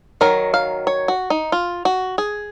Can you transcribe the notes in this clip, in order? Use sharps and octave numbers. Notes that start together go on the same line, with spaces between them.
D#3 F#3 A#4
F5
C#5
F#4
D#4
F4
F#4
G#4